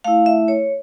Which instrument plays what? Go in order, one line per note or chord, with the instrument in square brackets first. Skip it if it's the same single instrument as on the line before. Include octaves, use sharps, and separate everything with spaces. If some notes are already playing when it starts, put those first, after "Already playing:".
[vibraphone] A3 E4 F5
E5
C#5